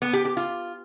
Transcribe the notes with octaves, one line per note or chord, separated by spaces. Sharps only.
B3
G4
G4
F4